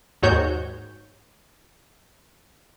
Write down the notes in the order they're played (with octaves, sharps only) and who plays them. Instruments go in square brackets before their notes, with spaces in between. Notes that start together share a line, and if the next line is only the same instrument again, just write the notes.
[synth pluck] D#2 G#2 F#4 C#5 G6